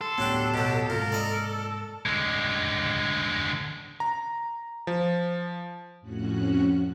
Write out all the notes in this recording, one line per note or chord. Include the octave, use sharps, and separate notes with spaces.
A4 C6
D2 A2 F#3 B3 D4 G4
B2 F#3 G4
G#2 C3 G#3 F4 A#4
D5 D#5
D3 G#3
A#5
F3
F2 A2 C#4 F#4 F#6